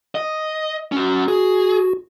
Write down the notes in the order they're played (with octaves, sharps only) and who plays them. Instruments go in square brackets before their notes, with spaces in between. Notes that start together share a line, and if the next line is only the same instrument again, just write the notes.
[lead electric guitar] D#5
C#4 F#4
[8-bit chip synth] F#4 [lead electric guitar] G#4